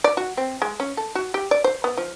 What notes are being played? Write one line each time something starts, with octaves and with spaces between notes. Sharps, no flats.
D5
F#4
C4
G#3
C#4
A4
F#4
G4
D5
C5
B3
F3